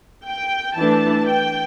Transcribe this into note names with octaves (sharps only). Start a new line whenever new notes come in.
G5
E3 A3 D4 A5
G5